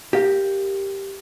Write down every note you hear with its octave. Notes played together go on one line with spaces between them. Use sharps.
G4 A#4 F5